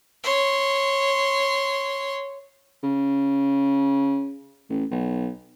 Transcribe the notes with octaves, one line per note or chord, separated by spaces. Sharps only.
C#5 C6
C#3
A1
B1